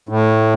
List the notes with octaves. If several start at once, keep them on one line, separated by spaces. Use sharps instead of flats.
A2